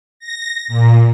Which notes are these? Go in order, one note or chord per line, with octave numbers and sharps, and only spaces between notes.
A#6
A#2